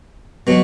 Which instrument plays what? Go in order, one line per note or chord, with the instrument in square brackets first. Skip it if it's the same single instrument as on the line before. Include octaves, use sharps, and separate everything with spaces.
[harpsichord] B2 F#3